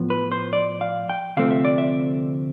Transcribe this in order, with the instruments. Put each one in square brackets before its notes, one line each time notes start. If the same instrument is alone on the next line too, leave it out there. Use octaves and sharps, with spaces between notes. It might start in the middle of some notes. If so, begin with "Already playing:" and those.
Already playing: [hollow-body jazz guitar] A2 F3 B3
B4
C5
D5
F5
G5
D2 C3 F3 A3 C4 F5
E5
D5
E5